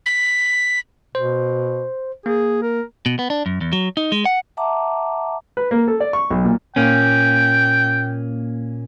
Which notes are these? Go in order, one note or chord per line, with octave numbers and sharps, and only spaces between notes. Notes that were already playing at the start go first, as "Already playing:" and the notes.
B6
B2 C5
A#3 G#4
A#4
B2
B3
D4
F#2
E2
F#3
D#4
G#3
F#5
E5 F#5 A5 A#5 D6
B4
A#3
A4
D5
C#6
B1
A#2
A#2 A#3 C#4 G5